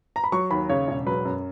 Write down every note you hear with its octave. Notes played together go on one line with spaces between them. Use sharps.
A#5
B5
F#3 C#6
D#2 B5
C#3 C#5
E1
F#3 B4
F#2